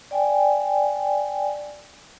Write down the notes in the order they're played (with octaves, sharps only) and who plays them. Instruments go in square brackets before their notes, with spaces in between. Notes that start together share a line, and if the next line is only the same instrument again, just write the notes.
[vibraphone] D5 G5 G#5